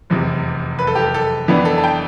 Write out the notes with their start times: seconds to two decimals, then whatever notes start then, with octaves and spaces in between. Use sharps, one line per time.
0.10 F1 E2 C3
0.79 B4
0.87 A4
0.95 G4
1.02 A4
1.14 A4
1.48 F2 E3 B3 D4
1.65 A4
1.78 A5
1.84 G5